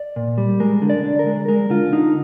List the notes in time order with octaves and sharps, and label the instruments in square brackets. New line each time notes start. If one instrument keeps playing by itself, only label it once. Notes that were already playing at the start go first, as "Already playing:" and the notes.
Already playing: [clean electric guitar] D5
A#2
G3
G#3 A#4
D3
D5
D3
A#4
G#3
G#3 A#4
D3 F4
D3 D#4